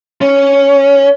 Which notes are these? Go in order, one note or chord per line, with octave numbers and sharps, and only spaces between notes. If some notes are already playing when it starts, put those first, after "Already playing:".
C#4